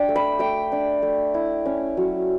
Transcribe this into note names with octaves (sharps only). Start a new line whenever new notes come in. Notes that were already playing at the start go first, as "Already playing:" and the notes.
Already playing: D4 G5
A3
B5
A3 G5
D4
A3
E4
C#4
F#3